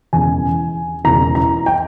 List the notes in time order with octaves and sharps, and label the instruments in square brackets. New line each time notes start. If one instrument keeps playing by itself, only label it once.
[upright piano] E1 E2 C#3 E3 G#5
E1 E2 C#3 E3 A#5
A#5
G5